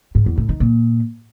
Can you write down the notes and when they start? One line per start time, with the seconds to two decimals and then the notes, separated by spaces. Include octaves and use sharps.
0.15 G#2
0.26 E2
0.38 A2
0.49 D#3
0.60 A#2